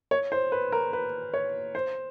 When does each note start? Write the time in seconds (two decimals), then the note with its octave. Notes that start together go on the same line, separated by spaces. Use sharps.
0.11 C#5
0.32 C5
0.52 B4
0.72 A#4
0.93 B4
1.34 C#5
1.75 C5